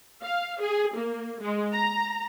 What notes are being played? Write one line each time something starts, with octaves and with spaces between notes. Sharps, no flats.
F5
G#4
A#3
G#3
A#5